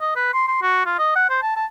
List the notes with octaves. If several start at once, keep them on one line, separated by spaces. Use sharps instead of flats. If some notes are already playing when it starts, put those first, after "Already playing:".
D#5
B4
C6
C6
F#4
F4
D#5
F#5
C5
A5
A5